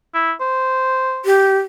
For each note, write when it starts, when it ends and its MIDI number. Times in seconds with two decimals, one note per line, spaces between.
0.14 0.32 64
0.40 1.25 72
1.25 1.58 67